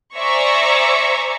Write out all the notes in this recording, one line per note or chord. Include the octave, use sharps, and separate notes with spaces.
C5 D5 E5 G#5 A#5 C#6